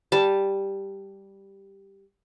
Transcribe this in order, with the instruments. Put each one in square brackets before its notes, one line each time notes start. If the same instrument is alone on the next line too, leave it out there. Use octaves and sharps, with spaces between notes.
[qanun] G3 A5